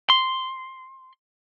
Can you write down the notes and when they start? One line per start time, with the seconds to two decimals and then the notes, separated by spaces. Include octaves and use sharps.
0.10 C6